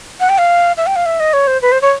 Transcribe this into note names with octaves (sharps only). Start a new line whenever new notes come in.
F#5
G5
F5
E5
G5
F5
E5
D#5
C#5
C5
B4
C5
C#5